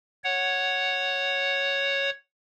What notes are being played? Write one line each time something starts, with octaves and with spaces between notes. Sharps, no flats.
C#5 F#5